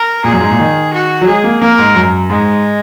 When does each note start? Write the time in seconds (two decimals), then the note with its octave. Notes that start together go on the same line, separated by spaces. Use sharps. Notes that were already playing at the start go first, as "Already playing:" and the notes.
Already playing: A#4
0.24 A#2 G#4
0.32 F#2
0.41 G#2
0.50 A#2
0.59 D#3
0.93 F#4
1.21 F#3
1.27 G#3 G#4
1.44 A#3
1.61 A#3 A#4
1.78 G#2
1.95 F#2
2.30 G#2 G#3